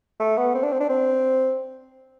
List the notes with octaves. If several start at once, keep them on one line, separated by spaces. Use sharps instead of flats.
A3
B3
C4
D4
C4
D4
C4